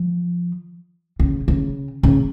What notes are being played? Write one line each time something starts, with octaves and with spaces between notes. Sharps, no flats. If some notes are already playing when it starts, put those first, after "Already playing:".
Already playing: F3
C#3
C#3
C#3